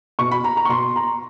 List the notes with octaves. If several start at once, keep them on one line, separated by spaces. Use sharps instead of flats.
B2 C#6
B5
A#5
A#5
C#6
B2 C6
A#5